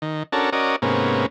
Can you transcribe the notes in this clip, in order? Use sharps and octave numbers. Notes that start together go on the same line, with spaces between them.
D#3
C#4 D4 F#4 A4 A#4
C#4 F#4 A#4 D5 D#5
G#2 C3 A#3 B3 C#4